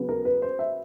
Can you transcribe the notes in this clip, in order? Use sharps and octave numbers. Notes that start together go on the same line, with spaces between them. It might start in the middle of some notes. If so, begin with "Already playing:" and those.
Already playing: C#3 F#3 B3
A#4
B4
C5
E5